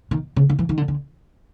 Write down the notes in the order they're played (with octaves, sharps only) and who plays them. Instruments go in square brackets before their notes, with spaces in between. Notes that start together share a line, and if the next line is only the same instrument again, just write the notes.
[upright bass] D#3
C#3
D3
E3
D#3
D3
D3